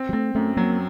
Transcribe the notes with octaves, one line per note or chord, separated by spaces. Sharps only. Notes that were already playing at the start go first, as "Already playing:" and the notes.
Already playing: C4
F#3
A3 C4
F#2 A3
F#3 A#3